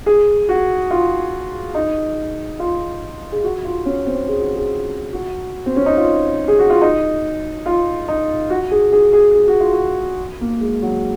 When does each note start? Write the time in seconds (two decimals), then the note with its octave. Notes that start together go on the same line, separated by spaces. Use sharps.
0.06 G#4
0.49 F#4
0.90 F4
1.74 D#4
2.59 F4
3.32 G#4
3.44 F#4
3.65 F4
3.85 C#4
4.06 C4
4.28 G#4
4.41 F#4
4.56 G#4
5.13 F#4
5.66 C4
5.76 C#4
5.86 D#4
5.97 F4
6.48 G#4
6.59 F#4
6.70 F4
6.81 D#4
7.66 F4
8.08 D#4
8.50 F#4
8.71 G#4
8.92 G#4
9.13 G#4
9.35 G#4
9.48 F#4
9.60 F4
9.73 F#4
10.41 A#3
10.61 G#3
10.82 F#3